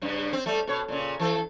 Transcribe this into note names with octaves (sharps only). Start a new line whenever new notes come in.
G2 C#3
C4
G3 A3
B2 C#5
A#2 C#3
E3 A4